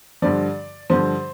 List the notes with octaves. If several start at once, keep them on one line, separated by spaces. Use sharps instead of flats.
G2 D3 F3 D5
G2 D3 F3 C5